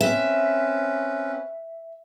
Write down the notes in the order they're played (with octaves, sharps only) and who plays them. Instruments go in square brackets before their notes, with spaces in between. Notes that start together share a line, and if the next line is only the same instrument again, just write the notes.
[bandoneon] C4 C#4 B4 [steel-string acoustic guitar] E5